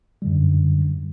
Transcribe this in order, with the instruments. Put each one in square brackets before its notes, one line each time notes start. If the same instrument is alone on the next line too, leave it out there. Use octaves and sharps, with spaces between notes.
[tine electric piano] F#2 D3 G3